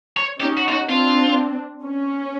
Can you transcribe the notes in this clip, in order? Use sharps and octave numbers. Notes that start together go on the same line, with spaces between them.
C#5
C#4 D#4 G4
F#4
F4
F#4
C4 D4 F4
C#4